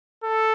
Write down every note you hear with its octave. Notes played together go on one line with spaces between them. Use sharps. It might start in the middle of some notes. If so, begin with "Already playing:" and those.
A4